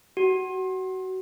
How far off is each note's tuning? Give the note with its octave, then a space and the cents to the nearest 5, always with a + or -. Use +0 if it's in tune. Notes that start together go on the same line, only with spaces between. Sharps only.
F#4 +25